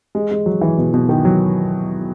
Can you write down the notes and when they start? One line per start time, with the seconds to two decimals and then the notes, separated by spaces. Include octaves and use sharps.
0.15 G#3
0.31 G#3
0.46 F#3
0.61 E3
0.78 B2
0.94 B2
1.09 D#3
1.25 F#3